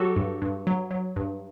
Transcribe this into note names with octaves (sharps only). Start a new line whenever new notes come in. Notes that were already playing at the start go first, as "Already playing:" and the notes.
Already playing: F#3 F#4 G4 A4
G2
G2
F#3
F#3
G2